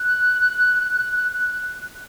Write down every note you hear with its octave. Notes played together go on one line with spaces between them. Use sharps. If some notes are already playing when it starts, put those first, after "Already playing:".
Already playing: F#6